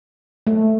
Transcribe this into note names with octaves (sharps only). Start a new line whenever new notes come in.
A3